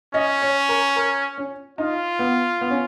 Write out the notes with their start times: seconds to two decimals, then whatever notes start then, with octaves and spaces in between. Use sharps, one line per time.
0.14 C#4 D#5
0.42 C#5
0.69 A#4
0.96 A#4
1.38 C#4
1.78 D#4 F4
2.19 B3
2.61 B3
2.70 C#4